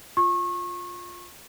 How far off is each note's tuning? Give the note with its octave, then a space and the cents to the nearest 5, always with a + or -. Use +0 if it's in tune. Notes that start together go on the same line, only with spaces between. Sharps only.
F4 +0 C#6 -30